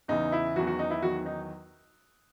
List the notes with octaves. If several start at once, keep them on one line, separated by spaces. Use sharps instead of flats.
E2 C#3 E3 D#4
E4
E2 D#3 F#3 F#4
F#4
D#4
E4
E2 D#3 F#3 F#4
D#4